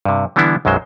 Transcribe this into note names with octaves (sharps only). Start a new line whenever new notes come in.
G2 C3
D3 E3 G3 B3 D4 E4
B1 F#2 F#3 G#3 C5